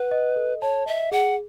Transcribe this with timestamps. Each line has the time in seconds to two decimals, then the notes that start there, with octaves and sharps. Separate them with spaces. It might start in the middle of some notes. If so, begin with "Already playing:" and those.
Already playing: B4 F#5
0.11 D#5
0.36 A4
0.61 C#5 A5
0.86 D#5 E5
1.12 G#4 F#5